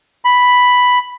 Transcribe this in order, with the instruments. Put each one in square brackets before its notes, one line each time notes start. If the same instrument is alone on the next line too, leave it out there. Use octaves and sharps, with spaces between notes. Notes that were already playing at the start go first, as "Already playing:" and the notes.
[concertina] B5